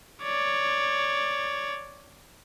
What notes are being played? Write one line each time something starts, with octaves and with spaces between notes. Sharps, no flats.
C#5 D5